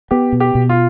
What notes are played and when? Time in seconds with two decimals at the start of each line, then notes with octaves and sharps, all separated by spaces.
0.11 B3 G4
0.32 B2
0.40 G4
0.55 B2
0.69 F4